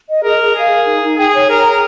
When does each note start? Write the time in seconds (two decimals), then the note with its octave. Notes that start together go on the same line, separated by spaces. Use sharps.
0.08 D#5
0.24 G#4 A#4
0.40 G#4
0.55 G#4 F5
0.71 A#4
0.86 D#4
1.02 D#4
1.17 G#4 G5
1.33 C#5
1.49 A#4 A#5
1.65 G#4